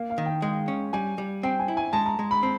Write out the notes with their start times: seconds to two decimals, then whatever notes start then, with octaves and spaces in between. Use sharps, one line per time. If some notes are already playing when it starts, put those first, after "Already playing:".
Already playing: A#3 F5
0.10 F5
0.18 D#3
0.26 G5
0.42 G#3 G5
0.68 C#4
0.93 G3 G#5
1.18 G3
1.43 C4 G5
1.60 G#5
1.68 E4
1.77 G#5
1.93 G#3 A5
2.06 A#5
2.19 G#3
2.31 B5
2.43 C4